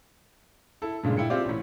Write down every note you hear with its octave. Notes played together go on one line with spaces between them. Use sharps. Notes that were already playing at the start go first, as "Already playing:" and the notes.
E4 A4
G2 A#2 C#3 G#3
E4 G5 C#7
C4 E4 F4 G4 D5
A1 A2